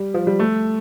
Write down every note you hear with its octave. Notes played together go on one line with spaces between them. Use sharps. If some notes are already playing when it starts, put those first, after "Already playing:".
Already playing: G3
F3
G3
A3